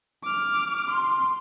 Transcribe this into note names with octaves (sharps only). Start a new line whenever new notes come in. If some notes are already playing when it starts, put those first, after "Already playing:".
D6 F6
C6